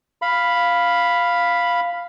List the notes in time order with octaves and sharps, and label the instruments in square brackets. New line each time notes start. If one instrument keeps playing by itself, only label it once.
[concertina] F5 B5